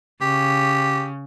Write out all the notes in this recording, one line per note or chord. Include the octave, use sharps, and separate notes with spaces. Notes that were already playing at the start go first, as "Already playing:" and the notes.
C#3 G4